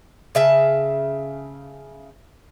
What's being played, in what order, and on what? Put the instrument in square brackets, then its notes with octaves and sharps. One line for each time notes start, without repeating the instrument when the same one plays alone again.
[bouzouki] C#3 E5 A5